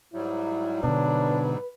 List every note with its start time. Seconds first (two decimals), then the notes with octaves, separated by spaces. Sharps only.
0.14 G#2 F#3 G3 E4
0.84 B2 D3 D4 B4